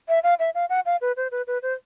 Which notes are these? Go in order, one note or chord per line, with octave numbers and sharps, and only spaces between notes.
E5
F5
E5
F5
F#5
F5
B4
C5
B4
B4
C5